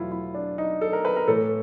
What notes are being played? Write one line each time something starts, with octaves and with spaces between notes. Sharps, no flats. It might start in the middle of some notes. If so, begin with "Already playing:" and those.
Already playing: E2 B2 F#3 A3 E4 F4
E4
D4
D#4
A4
A#4
B4
A#4
A2 E3 A3 A4